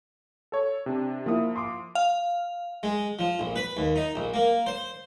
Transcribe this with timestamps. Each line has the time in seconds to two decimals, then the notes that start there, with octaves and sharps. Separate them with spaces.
0.52 A4 C#5
0.86 C3 D4
1.26 F3 A#3 E4 D#6
1.56 C6 D6
1.95 F5
2.83 G#3
3.19 F3
3.39 A#1
3.56 B4
3.77 D#2
3.96 D#4
4.15 A#1
4.34 A#3
4.66 C5